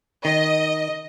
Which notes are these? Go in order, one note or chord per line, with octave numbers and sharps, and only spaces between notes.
D#3 D#5